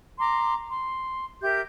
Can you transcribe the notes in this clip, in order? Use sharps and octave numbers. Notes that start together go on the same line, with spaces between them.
A#5 C6 D6
C6
G4 A#4 E5 G6